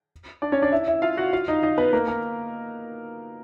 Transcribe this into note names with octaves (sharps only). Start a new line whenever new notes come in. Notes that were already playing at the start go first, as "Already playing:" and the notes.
D4 D5
C#4 C#5
D4 D5
E4 E5
E4 E5
F4 F5
F#4 F#5
F4 F5
D#4 D#5
D#4 D#5
B3 B4
A#3 A#4
A#3 A#4